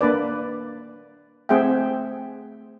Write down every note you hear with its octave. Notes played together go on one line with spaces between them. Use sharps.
A#3 D4 B4 D5
A3 C4 G#4 E5 F#5 G5